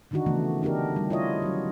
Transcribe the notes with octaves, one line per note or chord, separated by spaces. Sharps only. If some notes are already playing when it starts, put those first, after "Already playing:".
D3 D#3 D4 D#4 F#4
C#3 E3 F3 A3 B3
B3 D4 D#4 G4 A#4
G3
E4 F4 C#5 D#5
F#3 C#4